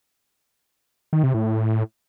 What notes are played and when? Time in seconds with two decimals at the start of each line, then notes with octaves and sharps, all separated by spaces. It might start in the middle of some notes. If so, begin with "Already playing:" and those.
1.13 D#3
1.23 C3
1.34 A2